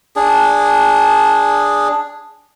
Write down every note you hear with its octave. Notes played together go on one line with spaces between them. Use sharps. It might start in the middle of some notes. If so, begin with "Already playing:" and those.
D4 G#4